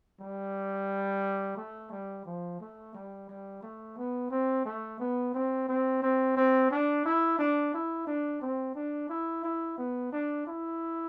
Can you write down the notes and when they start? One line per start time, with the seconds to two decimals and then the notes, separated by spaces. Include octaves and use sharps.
0.20 G3
1.57 A3
1.91 G3
2.26 F3
2.61 A3
2.94 G3
3.29 G3
3.62 A3
3.97 B3
4.31 C4
4.66 A3
4.99 B3
5.34 C4
5.69 C4
6.02 C4
6.37 C4
6.71 D4
7.05 E4
7.39 D4
7.74 E4
8.07 D4
8.42 C4
8.75 D4
9.09 E4
9.44 E4
9.78 B3
10.12 D4
10.47 E4